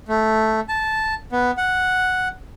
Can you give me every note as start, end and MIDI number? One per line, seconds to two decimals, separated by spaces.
0.08 0.60 57
0.69 1.14 81
1.32 1.51 59
1.58 2.28 78